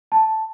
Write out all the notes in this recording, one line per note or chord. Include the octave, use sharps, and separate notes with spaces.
A5